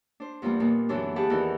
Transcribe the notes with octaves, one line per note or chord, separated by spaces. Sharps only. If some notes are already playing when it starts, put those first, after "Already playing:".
D4 C5
E2 F3 G3 A#3 B3
A#2 A#3 B3 D4 D#4
F#2 D3 E3 F#3 B3 D4
G4 G#4 B4 F5 F#5 A5
E2 D#3 E3 B3 D#4 A#4